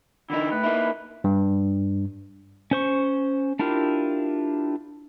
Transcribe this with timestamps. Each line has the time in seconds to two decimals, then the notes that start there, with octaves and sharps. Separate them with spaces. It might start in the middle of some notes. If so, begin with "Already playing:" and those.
0.30 D3 E3 D#4 E4
0.51 A2 B4
0.63 A#3 D#4 E4
1.24 G2
2.71 C#4 C5 C#6
3.59 D4 E4 F4 G4 A#4